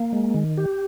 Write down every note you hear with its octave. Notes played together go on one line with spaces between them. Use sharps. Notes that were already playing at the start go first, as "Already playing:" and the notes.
Already playing: A#3
G#3
D#3
G4